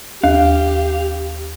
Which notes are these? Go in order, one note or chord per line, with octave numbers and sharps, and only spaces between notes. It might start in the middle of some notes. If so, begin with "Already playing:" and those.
D#2 G4 F5